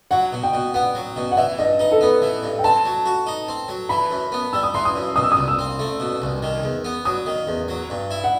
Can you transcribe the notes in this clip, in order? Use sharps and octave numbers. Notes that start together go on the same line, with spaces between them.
F#3 F#5
B2
G5
B2
B3 F#5
F#3
B2
F#5
E3 E5
G2 D#5
D#4 B4
A4
B3 B4
E3
G2
G5
C4 A5
F#3
F#4
D#4
C4
F#3
E3 B5
F#2
B3
G3 E6
D#6
E3 C6
D#6
F#2
B2 D#6
E6
D#6
C2
E6
C4
A3
B2
C2
D#3
E2
B3
F#3 D#6
D#3
E2
F#3
G2
E4
F#5